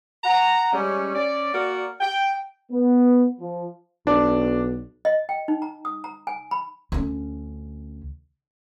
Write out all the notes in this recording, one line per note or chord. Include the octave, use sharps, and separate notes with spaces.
F#5 A#5
G3 G#3 C#4
C#4 D5
A#3 F#4 A#4 D5
G5
B3
F3
B1 D4
D#5
G5
D#4
A#5
D#6
A#5
G#5
B5
D2 C#4